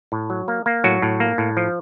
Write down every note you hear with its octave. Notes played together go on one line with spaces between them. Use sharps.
A2
F#3
A#3
A#3
A2 F#3 F#4
A2
A#3
A2
F3